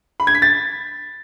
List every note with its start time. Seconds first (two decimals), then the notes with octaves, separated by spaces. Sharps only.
0.20 B5
0.27 G#6
0.35 B6
0.42 A6